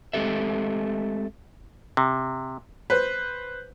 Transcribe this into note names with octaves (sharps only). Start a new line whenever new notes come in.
G#3 A3 C4 G4 A4 E5
C3
B4 C5